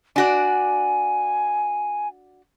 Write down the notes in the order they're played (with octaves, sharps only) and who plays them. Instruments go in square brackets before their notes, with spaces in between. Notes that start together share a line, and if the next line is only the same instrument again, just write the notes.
[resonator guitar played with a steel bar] D4 F#4 D5 [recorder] G#5